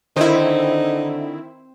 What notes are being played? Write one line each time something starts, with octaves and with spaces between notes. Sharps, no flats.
D3 D#3 C4 D#4 E4